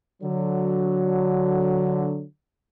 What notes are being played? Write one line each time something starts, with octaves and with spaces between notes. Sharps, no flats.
D3 F#3